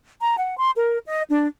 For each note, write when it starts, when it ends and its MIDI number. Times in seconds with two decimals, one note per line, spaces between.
0.21 0.35 82
0.37 0.56 78
0.56 0.71 84
0.76 0.98 70
1.05 1.22 75
1.29 1.46 62